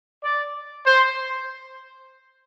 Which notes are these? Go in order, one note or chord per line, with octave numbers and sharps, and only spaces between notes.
D5
C5